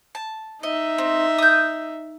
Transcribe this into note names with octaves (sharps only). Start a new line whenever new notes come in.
A5
D#4 D#5 E5
C4
D#6 G6